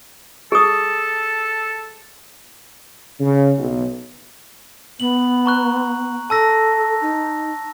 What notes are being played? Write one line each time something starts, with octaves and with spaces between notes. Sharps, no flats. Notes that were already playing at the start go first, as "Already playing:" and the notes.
G#4 A4 D#6
C#3
B1
B3 F#7
A#5 C#6 F#6
A4 A5 E6 A#6
D#4